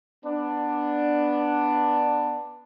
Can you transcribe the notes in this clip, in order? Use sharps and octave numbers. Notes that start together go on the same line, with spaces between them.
B3 D4